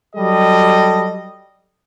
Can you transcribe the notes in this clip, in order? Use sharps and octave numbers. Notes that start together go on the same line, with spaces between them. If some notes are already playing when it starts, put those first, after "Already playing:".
F#3 G3 G4 A4 D#5